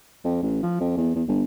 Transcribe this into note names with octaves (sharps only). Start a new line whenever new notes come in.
F2
A1
F3
F2
E2
E2
G1